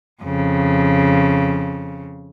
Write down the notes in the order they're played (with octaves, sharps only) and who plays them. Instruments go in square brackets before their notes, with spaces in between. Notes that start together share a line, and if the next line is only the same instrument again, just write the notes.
[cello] F2 C#3